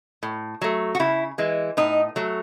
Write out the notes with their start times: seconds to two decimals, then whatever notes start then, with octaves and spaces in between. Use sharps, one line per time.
0.23 A2
0.61 F#3 A3
0.95 F#4
0.99 C#3 E4
1.38 E3 G#3
1.77 A2 D#4
2.16 F#3 A3